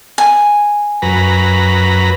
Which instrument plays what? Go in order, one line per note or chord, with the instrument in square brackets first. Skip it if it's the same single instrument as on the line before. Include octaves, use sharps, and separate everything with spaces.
[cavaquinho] G#5
[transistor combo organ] F#2 B4 A#5